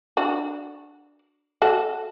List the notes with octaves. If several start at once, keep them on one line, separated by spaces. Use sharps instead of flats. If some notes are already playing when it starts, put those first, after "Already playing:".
D4 F#4
F#4 A4